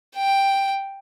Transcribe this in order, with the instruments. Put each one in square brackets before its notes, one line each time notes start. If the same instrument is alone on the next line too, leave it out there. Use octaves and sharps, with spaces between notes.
[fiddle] G5